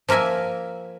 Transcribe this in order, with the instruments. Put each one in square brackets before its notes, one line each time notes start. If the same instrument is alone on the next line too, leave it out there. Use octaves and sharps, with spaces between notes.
[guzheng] F3 A#3 A#4 E5 G#5